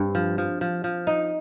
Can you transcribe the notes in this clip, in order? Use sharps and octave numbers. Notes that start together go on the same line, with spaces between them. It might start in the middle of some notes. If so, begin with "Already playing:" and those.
Already playing: G2 C4
F3
F3
F3
F3
D#4